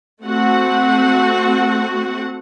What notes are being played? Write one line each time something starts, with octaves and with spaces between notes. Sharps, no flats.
A3 C4 F#4 F#5